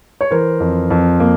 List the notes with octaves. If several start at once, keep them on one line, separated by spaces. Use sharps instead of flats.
C#5
E3 A#4 C5
F2
F2
A#3